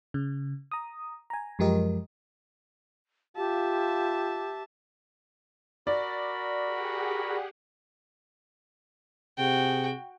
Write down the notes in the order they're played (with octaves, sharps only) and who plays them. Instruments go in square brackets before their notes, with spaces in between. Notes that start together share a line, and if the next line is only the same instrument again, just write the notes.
[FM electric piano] C#3
A#5 D#6
G#5 A#5
F#2 F3 G#3 G4 A#4 D#5
[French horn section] F4 [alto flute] G4 [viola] E5 A5
[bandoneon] F#4 A#4 B5 [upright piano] D5
[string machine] G4 G#4 F#5
[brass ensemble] C3 G#4 [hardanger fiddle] F#4 G5